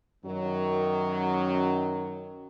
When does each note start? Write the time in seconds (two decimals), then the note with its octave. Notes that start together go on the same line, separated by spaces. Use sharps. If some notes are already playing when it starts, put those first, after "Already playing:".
0.25 F#2 D#3 F#3